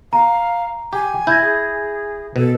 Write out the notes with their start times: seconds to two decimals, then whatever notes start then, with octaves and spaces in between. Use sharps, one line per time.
0.13 F5 A#5
0.93 G4 G#5
1.27 E4 G6 G#6 A#6
1.41 G#4
2.36 B2 A4